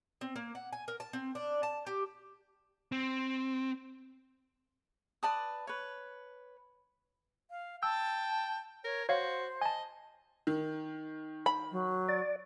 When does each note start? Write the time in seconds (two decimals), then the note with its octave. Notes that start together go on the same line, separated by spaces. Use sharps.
0.21 C4
0.36 A#3
0.55 F#5
0.73 G#5
0.88 A#4
1.00 A5
1.13 C4
1.35 D4
1.63 A5
1.87 G4
2.92 C4
5.23 B4 D5 A5 D#6
5.67 B4 C#5
7.50 F5
7.83 G5 A5 E6
8.85 A#4 C#5
9.09 F#4 C5 C#5 F5
9.61 D#5 G#5 A5
10.47 D#3
11.46 B5
11.72 F#3
12.09 D5